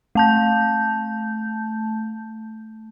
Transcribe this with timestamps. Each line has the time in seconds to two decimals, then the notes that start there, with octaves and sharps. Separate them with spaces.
0.15 A3 A5 G6